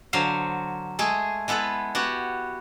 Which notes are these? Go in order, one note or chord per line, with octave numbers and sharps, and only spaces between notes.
D3 F#3 C5 F5
G#3 A3 G#4
G#3 B3 E4 A4 B4
B3 F#4 G4